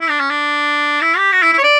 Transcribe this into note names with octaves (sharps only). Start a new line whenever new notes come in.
E4
D4
C#4
D4
E4
G4
F#4
E4
E4
C#5
D5